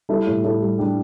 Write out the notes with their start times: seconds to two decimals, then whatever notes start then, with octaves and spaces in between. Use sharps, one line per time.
0.09 G3 E4 A4
0.27 A2
0.44 A2 E4 A4
0.61 G3
0.79 G3 D4 G4